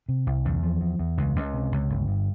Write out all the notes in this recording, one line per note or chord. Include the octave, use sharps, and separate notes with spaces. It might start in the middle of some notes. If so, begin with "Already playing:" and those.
C3
C2
E2
F3
E2
E2
C#2
C#2
C3
C#2
G1
G2